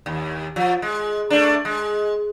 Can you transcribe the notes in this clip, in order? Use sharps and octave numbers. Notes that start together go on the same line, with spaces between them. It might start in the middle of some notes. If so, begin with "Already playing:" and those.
D#2
F3
G#3
A3 D4
G#3